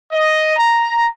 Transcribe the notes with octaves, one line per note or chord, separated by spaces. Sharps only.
D#5
A#5